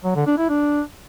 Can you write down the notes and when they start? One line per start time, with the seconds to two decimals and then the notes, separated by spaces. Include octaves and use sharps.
0.04 F#3
0.15 D3
0.27 D4
0.38 E4
0.49 D4